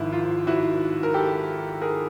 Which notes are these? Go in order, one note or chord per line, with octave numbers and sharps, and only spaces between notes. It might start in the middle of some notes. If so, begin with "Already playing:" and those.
Already playing: G#1 G#2 F3 E4
F4
E4 F#4
A#4
G4 A4
G#4 A#4